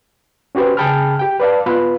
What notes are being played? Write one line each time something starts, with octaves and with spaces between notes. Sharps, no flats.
C#4 F#4 G4 B4 C5
C#3 G#4 G5 A5 B5 F6
G4 G5
B4 D5 F5 A5
B3 F4 B4